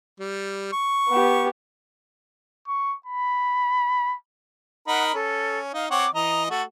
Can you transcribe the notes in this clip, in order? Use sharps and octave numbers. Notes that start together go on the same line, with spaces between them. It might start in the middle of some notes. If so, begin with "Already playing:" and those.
G3
C#6
B3 G4
C#6
B5
D#4 A#4 F#5 B5
C#4 A4
D#4 F5
C4 C#5 F#5 D6
E3 D#5 A#5
A3 F#4 A4